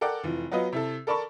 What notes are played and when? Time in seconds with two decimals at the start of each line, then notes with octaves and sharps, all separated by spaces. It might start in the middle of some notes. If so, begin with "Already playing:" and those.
0.01 A4 A#4 D5 F#5 G5 D6
0.24 F1 E3 F3
0.51 F#3 B3 F4 B4 D#5
0.72 C3 E4 A4
1.07 A4 A#4 D5 A5 B5 C#6